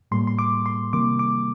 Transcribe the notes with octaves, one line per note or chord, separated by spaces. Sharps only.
A2 G3 A#3 C6
C6
D6
C6
C3 D#3 G3 A#3 D6
D6